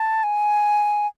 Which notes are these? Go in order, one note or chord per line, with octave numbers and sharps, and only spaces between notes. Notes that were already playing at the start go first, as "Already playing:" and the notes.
Already playing: A5
G#5